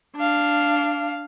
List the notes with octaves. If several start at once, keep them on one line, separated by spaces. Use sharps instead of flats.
D4 F5